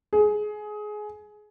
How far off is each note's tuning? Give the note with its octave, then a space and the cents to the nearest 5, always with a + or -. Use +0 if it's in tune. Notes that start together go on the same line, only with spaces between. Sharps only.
G#4 +20